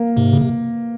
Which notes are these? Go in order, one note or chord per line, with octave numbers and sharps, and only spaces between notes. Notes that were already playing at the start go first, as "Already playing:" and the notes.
Already playing: A#3
G#2 C3
C#3
C3